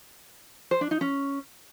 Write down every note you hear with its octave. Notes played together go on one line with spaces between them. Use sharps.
C5
D4
D#4
C#4